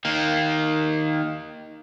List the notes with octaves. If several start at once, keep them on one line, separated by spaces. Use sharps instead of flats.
D#3 A#3